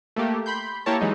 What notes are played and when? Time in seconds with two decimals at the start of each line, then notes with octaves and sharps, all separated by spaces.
0.16 A3 A#3 G4
0.46 B5 C6 G6
0.86 A#3 E4 G4 A#4 C#5 A5
1.01 E3 F#3 G#3 D#4